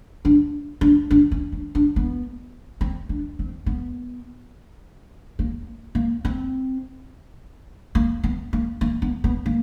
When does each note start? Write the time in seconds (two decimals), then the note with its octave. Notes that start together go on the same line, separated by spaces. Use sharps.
0.25 D4
0.81 D4
1.11 D4
1.32 C#4
1.52 D4
1.75 D4
1.96 B3
2.81 C4
3.09 D4
3.39 C4
3.66 B3
5.39 A#3
5.95 A#3
6.25 C4
7.95 A#3
8.24 B3
8.53 A#3
8.81 A#3
9.02 B3
9.24 B3
9.46 A#3